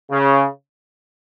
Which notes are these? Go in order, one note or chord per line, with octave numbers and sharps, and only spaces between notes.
C#3